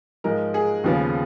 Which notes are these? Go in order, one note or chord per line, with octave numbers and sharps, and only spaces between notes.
G#2 F3 G#3 A#4
G#4
D#2 C#3 F3 B3